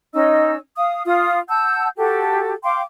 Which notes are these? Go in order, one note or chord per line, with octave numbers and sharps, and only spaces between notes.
C#4 D#4 D#5 E6
F5 D#6
F4 D#6
F#5 A5 E6 G6
F#4 G4 A4
F5 G5 C6 D6